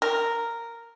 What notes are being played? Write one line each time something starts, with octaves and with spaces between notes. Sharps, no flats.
A#4